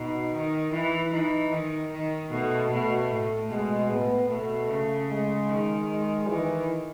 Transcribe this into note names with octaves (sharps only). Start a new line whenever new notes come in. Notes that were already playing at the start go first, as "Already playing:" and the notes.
Already playing: B2 D#4
D#3
E3 E4
E3 D#4
D#3
D#3
B2 A3
B2 A3
A2
B2 G#3
A2 B3
B2 A3
C#3
G#3
D#3
G#3
D#3 E3